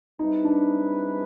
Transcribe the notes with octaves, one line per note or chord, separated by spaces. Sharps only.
G3 C4 D#4 E4 G#4 B4
D4